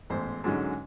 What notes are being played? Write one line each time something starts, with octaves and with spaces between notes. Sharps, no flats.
A1 E2 G#2 C5
G#2 D3 F#3 G#3 C#4 D#4